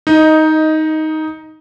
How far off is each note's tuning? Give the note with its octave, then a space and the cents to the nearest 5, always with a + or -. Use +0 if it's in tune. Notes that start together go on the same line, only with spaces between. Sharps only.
D#4 +10 D#5 +0